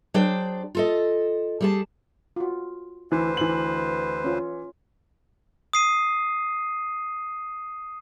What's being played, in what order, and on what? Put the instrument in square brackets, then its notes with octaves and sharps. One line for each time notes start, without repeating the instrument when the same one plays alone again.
[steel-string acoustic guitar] F#3 D4 G#4 C5 D5 G5
F4 A4 D#5
G3 G#4 A5
[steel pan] F4 F#4
[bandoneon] D2 B4 C5 [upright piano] E3
[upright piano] E3 F#7
[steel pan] C#4 F4
[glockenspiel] D#6 C7 D#7